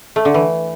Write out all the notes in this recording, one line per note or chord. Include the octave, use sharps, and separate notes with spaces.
A3
D3
E3